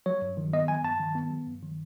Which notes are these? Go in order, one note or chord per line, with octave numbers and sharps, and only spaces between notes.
F#3 C#5
G2
D#3
B3 D#5
F#3 G#5
G2 A5
D#3
B3
F#3
G2
D#3